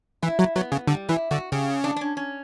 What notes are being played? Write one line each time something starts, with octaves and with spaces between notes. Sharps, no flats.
E3 E4
F#3
F#3 B3
C#3
D3 G3
E3 E4
D3 F#4
C#3 G4
D4
D4
C#4
C#4